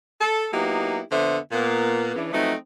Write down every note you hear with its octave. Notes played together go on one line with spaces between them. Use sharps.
A4
F#3 A#3 B3 D#4 E4 G4
F2 D3 B3 C5 E5
A#2 A#3 B3
C#3 E3 D4
F3 F#3 A3 B3 C4 D#4